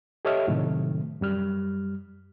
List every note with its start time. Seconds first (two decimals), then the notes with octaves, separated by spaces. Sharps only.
0.25 G4 A4 C#5 D#5 E5 F6
0.47 A2 C3 D#3 F#3 A3
1.21 F#2 G3 F6